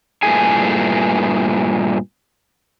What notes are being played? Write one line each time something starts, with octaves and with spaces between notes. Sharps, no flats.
G2 A#2 A3 E4 G#4 G#5